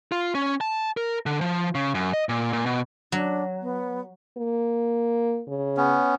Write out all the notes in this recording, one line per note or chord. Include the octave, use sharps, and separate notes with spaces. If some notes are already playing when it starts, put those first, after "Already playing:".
F4
C#4
A5
A#4
D3
F3
C#3
F#2
D#5
A#2
A#2
B2
F#3 D4
B3
A#3
C#3
B3 C#4